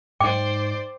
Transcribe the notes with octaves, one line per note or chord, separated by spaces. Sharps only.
G#2 D#4 C5 D5 G5 D6